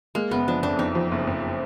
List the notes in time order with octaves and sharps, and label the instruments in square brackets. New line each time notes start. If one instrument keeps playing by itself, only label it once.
[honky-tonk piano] G#3 [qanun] A#3
[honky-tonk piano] F#1 [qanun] B3
[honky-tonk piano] F3 [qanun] D4
[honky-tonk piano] F2 [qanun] D4
[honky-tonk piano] F2 [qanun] D#4
[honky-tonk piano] F3
F#1
F2